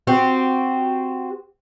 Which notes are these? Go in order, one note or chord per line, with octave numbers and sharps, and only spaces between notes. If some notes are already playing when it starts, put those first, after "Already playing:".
C4 F#4 G4